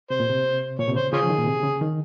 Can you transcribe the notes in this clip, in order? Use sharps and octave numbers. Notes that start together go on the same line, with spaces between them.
C3 C5
A#2
C3
A#2 C#5
C3
C#3 C5
C#3 C#4 F4 G#4
F3
D#3
A#2
C3
C#3
D#3